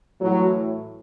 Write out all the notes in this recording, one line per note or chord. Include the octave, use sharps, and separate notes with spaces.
A2 E3 F#3